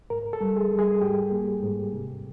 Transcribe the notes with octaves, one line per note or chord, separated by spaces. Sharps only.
G#2 A#4
A4
G3
G#4
G3
G#4
G#2 G4
A#3
G#2
C3